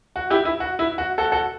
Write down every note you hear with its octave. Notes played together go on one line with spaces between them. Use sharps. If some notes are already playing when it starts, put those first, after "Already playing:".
F#4
E4 G4
E4
F#4
E4
F#4
F#4 A4
F#4 A4